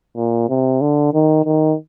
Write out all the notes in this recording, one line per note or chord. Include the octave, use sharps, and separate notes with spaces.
A#2
C3
D3
D#3
D#3